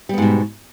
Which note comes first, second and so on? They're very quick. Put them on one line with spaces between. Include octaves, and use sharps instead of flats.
G3 B3 G#2 B2